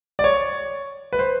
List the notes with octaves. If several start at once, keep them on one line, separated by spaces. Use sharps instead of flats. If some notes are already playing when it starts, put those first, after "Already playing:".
D5
C#5
B4
C5